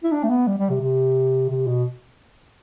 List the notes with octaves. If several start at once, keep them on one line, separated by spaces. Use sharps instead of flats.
E4
D4
A3
B3
G3
G3
C3
C3
C3
B2